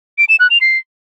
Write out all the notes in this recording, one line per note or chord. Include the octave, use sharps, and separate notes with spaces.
D7
E7
F#6
F7
C7